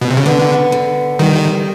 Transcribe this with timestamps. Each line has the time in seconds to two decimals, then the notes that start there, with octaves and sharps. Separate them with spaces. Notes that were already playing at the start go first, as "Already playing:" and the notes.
0.01 B2
0.10 C3
0.17 C#3
0.26 D3 B3
0.72 D3
1.19 D#3 G3